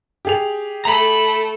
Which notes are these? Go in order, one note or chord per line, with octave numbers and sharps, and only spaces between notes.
G4 G#4 F7
A3 A#5 B5